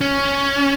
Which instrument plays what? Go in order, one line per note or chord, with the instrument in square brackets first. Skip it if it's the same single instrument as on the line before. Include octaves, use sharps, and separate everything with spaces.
[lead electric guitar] C#4